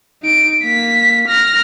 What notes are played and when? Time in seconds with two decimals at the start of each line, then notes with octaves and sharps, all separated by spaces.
0.22 D#4 D7
0.63 A#3 B6
1.28 F6 A#6